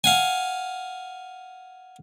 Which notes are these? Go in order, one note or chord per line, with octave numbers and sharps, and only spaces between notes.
F5 F#5 G#5